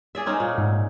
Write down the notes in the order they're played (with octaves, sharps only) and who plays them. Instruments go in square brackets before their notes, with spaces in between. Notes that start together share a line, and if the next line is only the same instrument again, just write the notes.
[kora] G#4 D5 E5
C4 C#4 D#4
A#2
[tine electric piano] G#2